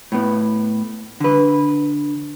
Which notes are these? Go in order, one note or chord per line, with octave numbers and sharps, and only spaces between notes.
A2 B3
D3 B4